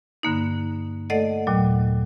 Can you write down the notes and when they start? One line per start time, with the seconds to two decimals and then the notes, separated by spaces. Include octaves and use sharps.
0.23 G2 D3 A#3 D#4
1.10 A3 A4 D5 D#5 F#5
1.47 D#2 A#2 F#3